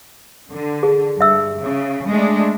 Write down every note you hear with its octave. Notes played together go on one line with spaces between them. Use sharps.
D3
G#4
G2 E5 E6
C#3
G#3 A3 D4